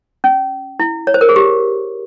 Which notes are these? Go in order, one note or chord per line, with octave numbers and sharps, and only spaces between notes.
C#4
E4
C#5
C5
A#4
G#4
G4